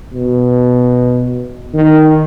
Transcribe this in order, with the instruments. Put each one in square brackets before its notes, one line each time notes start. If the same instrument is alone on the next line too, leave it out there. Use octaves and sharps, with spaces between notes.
[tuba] B2
D#3